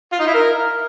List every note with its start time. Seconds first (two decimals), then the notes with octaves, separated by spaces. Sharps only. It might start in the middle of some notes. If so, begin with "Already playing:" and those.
0.13 F4
0.20 D#4
0.27 E4
0.34 A#4